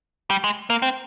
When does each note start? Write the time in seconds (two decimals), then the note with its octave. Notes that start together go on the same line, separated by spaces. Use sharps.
0.30 G3
0.44 G#3
0.70 A#3
0.82 C4